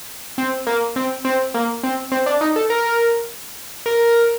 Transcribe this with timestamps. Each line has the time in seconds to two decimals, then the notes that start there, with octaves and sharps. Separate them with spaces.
0.38 C4
0.67 A#3
0.96 C4
1.25 C4
1.54 A#3
1.83 C4
2.12 C4
2.26 D4
2.41 D#4
2.56 A4
2.70 A#4
3.86 A#4